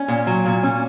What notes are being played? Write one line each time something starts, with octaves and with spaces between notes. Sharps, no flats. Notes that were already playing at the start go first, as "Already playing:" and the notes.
Already playing: C#4
A#2
F#3
A#2
C#4